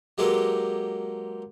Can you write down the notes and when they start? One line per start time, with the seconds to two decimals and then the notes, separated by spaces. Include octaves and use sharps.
0.18 F#3 G#3 A#3 G4 A4 B4